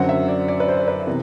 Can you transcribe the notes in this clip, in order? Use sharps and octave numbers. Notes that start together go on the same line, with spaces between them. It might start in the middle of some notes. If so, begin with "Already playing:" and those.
Already playing: F#2 D3 F#3 C4 F#5
E5
D5
D5
B4
C5
B4
C3 E3 B3